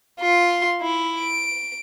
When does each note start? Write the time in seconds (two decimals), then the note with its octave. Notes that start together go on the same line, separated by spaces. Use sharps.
0.20 F4 C6
0.82 E4
1.19 D7